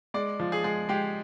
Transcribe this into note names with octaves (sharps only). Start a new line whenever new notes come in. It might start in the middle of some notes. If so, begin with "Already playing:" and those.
G#3 D5
F3
G#4
G#3 G#4
G#3 G4